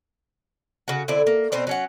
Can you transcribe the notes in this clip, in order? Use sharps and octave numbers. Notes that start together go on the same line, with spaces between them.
C#3 F#4
D3 C4 E4 D5
A#3
B2 C4 C5 D5
F#3 C#4 F#5